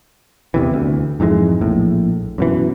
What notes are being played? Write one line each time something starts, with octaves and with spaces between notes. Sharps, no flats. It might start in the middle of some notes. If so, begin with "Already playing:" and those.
E2 C3 E3
D2
F2 G#2 E3 G#3
A#1 A2
F#2 B2 E3